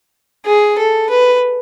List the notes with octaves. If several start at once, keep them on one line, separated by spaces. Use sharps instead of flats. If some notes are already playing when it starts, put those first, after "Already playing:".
G#4
A4
B4